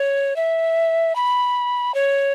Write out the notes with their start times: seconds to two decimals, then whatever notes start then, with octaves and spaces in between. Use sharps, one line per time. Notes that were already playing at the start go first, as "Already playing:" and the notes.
Already playing: C#5
0.36 E5
1.15 B5
1.94 C#5